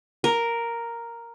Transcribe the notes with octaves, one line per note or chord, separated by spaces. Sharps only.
A#4